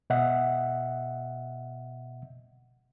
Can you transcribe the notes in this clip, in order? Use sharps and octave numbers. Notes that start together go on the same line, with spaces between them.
B2 D#5 E5 F#5